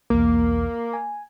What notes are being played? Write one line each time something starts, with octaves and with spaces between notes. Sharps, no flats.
B1 E2 A#3
G#5